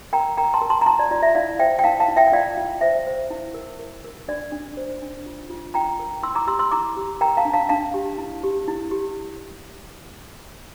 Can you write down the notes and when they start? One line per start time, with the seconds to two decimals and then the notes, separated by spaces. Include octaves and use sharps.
0.13 A#4 G5 A#5
0.37 A#4 G5 A#5
0.54 A5 C6
0.61 A#4
0.70 A5 C6
0.81 A#5
0.86 F4 A5 C6
0.99 D5
1.11 F4 D5
1.22 E5
1.35 E4 D5 F5
1.59 C5 E5 G5
1.79 G5
1.84 E4 F5 A5
2.00 F5 A5
2.08 E4
2.17 E5 G5
2.27 G5
2.32 F4 D5 F5
2.57 F4
2.81 C5 E5
3.07 C5
3.30 E4
3.54 A#4
3.79 A#4
4.04 A#4
4.28 D4 D5
4.52 D4
4.77 C5
5.02 D4
5.26 F4
5.50 F4
5.74 F4 G5 A#5
5.99 A#4
6.23 E4 C6 E6
6.35 A#5 D6
6.47 G4 C6 E6
6.59 C6 E6
6.71 E4 A#5 D6
6.97 G4
7.21 A#4 G5 A#5
7.37 F5 A5
7.45 D4
7.53 F5 A5
7.69 D4 F5 A5
7.94 G4
8.18 E4
8.43 G4
8.68 E4
8.91 G4